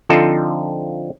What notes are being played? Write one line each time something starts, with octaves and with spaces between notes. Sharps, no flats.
D3 F3 C4 D#4 F4 A4